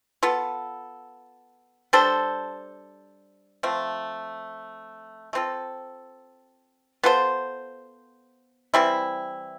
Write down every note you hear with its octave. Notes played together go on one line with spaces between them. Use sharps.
B3 F4 A4
G3 D4 A4 C5
F3 A3 C4
A3 C4 F4 A4
B3 F4 A4 C5
E3 G3 C4 E4